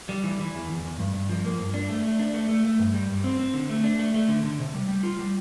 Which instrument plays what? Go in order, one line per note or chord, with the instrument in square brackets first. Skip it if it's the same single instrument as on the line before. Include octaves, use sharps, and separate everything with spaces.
[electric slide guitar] G3
E3
E3
E2
E2
E2
G2
G2
F3
A#3
G2
D4
A3
A3
D4
A3
A3
A3
G2
G3
G2
C4
C4
D3
A3
D4
A3
A3
D3
D3
C3
G3
G3
F4
G3